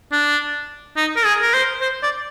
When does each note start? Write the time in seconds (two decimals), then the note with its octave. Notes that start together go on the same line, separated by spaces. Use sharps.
0.12 D4
0.97 D#4
1.16 A#4
1.25 G#4
1.42 A#4
1.54 C5
1.81 C5
2.03 D5